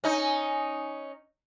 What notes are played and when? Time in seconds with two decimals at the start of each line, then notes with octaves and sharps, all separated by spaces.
0.04 C#4 D#4